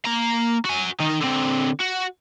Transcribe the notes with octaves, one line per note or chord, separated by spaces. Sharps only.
A#3 A#5
F#4 G#5
D#3 D#4
D3 C4
F#4